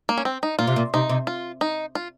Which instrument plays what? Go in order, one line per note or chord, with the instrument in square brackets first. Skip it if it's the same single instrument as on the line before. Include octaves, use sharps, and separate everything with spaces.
[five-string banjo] A#3
C#4
C4
D#4
[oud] A#2 [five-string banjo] F4
[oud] C3
A#2
[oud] C3 [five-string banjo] D#4
[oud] C3
[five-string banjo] F4
D#4
F4